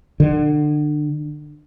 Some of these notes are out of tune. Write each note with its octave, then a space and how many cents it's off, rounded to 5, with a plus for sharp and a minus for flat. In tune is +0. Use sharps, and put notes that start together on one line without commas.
D3 +30